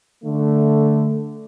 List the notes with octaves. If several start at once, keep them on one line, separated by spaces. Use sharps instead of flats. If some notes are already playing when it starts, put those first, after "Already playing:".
D3 A3